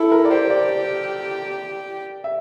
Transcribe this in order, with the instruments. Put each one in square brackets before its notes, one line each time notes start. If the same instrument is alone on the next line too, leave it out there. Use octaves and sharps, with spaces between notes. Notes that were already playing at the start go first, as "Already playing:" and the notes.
Already playing: [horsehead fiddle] E4 [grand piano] A4
[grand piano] A#4
D5
[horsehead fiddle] G4 [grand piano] C5
[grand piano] D5
D5
E5